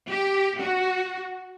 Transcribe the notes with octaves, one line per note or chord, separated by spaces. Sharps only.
G4
F#4